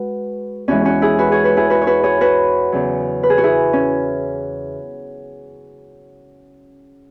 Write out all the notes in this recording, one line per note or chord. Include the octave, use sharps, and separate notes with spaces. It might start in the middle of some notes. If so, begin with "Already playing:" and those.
Already playing: G#3 F#4 B4
E2 E3 G#3 C#4 F#4
C#4 F#4
E4 G#4
F#4 B4
G#4 C#5
F#4 B4
E4 G#4
F#4 B4
C#5
F#4 B4
G#4 C#5
F#4 B4
E2 C#3 F#3
B4
G#4
F#4
E4 G#4
C#4